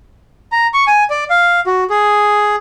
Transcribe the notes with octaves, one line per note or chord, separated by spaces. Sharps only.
A#5
C#6
G#5
D5
F5
F#4
G#4